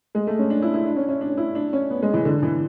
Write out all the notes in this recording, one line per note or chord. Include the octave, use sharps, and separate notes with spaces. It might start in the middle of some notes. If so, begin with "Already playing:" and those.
G#3
A3
C#4
D4
E4
E4
D4
C#4
C#4
D4
E4
D4
C#4
B3
G#3
E3
D3
E3